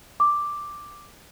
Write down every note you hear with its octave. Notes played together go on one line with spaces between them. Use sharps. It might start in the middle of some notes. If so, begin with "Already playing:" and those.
D6